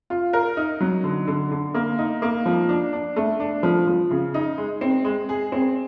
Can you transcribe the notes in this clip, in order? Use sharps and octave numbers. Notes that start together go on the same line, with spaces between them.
F4
A#4
D#4
F#3
D3
D3
D3
A#3
D#4
A#3
F3
D4
D4
A3
D4
F3
F3
C#3
D#4
G#3
C4
G#3
G#4
C4